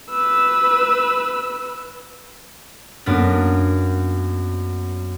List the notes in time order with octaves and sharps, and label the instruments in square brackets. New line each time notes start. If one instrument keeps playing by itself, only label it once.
[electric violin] B4 E6
[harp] F#2 A#3 B3 D4